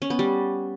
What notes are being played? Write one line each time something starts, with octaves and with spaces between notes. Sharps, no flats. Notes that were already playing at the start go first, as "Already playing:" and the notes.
C#4
B3
G3